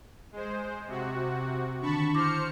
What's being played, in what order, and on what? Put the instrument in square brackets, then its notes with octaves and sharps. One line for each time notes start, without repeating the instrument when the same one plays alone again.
[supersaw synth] G#3 C5
C3 F#4
[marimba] D3 D#3 D4 [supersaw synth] A5 B5 C#6
[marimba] E4 D6 A#6 [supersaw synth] C5 F6 C#7